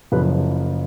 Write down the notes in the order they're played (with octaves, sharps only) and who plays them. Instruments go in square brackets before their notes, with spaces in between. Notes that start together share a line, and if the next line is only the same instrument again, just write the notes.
[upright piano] F#1 F#2 C#3 F3 B4